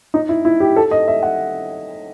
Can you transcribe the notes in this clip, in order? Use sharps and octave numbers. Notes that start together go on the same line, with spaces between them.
D#4
E4
E4
G4
A4
D#5
E5
F#5